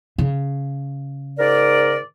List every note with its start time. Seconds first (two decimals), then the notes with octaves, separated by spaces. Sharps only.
0.18 C#3
1.39 G#2 A#4 D5